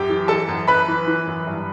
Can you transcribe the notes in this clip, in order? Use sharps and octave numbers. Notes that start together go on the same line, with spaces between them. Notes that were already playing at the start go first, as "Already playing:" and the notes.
Already playing: F#2 G4 G5
E3
E3 A4 A5
F#2
F#2 B4 B5
E3
E3
F#2
G2